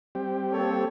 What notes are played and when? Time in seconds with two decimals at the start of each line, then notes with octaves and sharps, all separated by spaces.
0.15 G3 C4 G4
0.52 A#3 A4 C#5